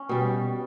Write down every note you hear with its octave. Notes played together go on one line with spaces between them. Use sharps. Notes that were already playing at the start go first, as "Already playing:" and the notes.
Already playing: C#4
B2 G3